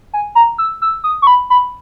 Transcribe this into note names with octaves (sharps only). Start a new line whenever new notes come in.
G#5
A#5
E6
E6
D#6
C#6
B5
B5